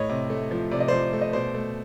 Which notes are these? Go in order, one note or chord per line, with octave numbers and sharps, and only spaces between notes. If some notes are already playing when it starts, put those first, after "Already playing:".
Already playing: A2 C#5 D#5
C3
A3
F3
C3 D5
D#5
F3 C5 D5
A3
D#5
B2 C5 D5
A3